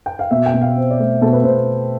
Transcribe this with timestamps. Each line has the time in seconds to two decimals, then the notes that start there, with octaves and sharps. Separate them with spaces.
0.06 G5
0.19 F5
0.31 B2 E5
0.46 G5
0.54 B2
0.61 F5
0.76 C4
0.91 D5
0.99 A3
1.21 B2 A4
1.33 B4
1.44 B2 C5